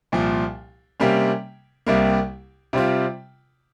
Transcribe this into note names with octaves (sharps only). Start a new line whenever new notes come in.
C2 A#2 F3
C3 G3 A#3 C#4
C2 C3 G3 A#3
C3 G3 C4 F4